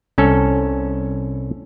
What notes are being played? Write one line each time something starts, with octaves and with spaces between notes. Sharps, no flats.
C2 C#4 A4